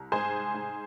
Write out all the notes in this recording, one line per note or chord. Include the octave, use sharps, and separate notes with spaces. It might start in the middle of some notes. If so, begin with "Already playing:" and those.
Already playing: C2
G#2 G#4 C5
G#2